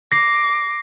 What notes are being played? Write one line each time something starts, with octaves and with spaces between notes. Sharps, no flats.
D6 A#6 C7